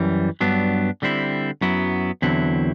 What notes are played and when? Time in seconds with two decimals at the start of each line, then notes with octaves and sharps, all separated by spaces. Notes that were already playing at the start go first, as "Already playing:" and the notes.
Already playing: F#2 E3 G3
0.41 G2 F#3 B3 D4
1.02 D3 G3 C4 E4
1.61 F#2 F#3 B3 E4
2.22 E2 D3 F#3 C4 E4